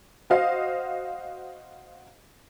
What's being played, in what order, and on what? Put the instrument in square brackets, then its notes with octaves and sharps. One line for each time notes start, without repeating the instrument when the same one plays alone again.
[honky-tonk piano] F#4 C5 D#5 F5